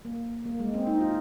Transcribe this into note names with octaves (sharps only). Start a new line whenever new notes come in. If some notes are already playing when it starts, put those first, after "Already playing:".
A#3
A#3
G#3
C4
D#4
F4